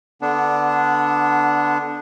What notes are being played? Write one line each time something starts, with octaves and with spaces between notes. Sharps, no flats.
D3 B3 D4